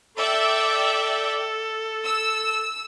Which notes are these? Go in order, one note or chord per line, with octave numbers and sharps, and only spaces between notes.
A4 D5 E5 G5
E6